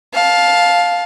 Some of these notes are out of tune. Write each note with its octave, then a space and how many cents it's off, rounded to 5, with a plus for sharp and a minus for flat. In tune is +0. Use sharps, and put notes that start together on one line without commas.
F5 +10 A5 -10